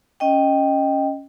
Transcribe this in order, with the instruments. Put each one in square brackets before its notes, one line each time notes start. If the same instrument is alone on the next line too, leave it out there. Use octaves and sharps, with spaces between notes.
[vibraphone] C#4 D#5 G5